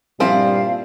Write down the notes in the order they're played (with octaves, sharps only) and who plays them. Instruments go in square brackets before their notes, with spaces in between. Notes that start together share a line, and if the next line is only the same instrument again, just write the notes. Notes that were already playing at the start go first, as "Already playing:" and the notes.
[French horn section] G2 A#2 G3 [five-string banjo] F3 C4 E4 [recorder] F5